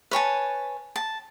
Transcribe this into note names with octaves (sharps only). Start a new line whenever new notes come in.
B4 C#5 G#5 A5
A5